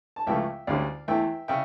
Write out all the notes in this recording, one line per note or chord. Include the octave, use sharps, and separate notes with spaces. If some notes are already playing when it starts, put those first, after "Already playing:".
A5
C#2 C#3 F3 A3 E5 G5
D2 D3 G3 C#4 D5 F5
E2 E3 A3 E5 G5
C#3 E5 G5